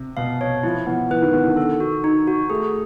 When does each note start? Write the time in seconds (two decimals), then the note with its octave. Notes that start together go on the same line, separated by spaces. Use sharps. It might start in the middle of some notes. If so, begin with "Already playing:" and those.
Already playing: C3
0.17 B2 F5
0.41 B2 C#5
0.63 F3 E4
0.87 E3 B3
1.10 E3 B4
1.22 D#3
1.34 D3 B3
1.46 D#3
1.57 A4
1.80 F#4
2.04 D#4
2.27 F#4
2.50 A3 G#4